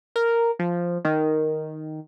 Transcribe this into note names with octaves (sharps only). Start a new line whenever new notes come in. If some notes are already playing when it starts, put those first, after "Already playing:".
A#4
F3
D#3